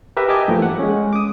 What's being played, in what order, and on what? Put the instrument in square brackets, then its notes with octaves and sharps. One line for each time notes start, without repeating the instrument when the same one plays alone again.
[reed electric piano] G4 A#4 B4 E5
G4 D#5 G#5 A5 D6
G2 E3 F3 A3 A#3
F#5
G#3 C#4
D6 D#6